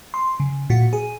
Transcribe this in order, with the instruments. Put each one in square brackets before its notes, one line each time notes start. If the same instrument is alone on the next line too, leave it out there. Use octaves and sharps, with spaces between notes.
[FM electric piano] C6
C#3
A#2 F#4 C#7
G#4